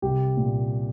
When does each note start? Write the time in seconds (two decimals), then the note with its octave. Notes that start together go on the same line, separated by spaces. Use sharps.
0.02 C2 G4
0.37 A#2